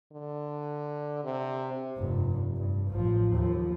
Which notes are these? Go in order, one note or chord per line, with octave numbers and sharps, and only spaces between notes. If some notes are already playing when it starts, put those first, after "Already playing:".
D3
C3
F1 G2
G2
A1 F3
D#2 F3